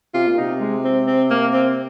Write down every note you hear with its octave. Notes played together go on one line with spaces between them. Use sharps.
C3 F4
A#2
C3 D#4
G#3
C4
C4
A#3
C4